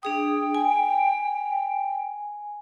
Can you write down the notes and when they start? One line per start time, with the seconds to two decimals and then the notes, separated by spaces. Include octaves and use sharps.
0.03 D4 G#4 G5 D#6
0.55 G#5